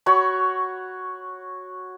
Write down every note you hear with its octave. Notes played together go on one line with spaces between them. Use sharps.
F#4 C#5 B5 C#6